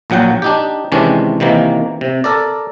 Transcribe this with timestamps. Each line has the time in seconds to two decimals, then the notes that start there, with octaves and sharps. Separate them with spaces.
0.10 A#1 A#2 F#3 F#5 G5
0.42 D4 D#4 G4
0.92 C3 D#3 E3 G#3 C#4 D4
1.40 C3 D#3 E3 A#3
2.01 C3
2.24 A4 A#4 D5